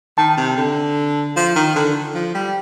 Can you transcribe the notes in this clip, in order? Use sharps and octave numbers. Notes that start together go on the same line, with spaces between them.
D#3 A5
C3
D3
F3
D#3
D3
F3
G3